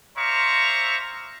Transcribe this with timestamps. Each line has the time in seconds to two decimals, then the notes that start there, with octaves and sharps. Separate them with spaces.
0.17 C5 D5 E5 F5 A#5 C#6